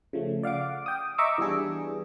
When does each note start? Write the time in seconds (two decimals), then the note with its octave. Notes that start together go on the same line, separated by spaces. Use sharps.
0.13 C#3 F3 A3
0.43 D5 F5 F#5 D6
0.86 G5 D#6
1.18 D#5 E5 A#5 C#6 D6 E6
1.38 E3 G3 B3 D4 G#4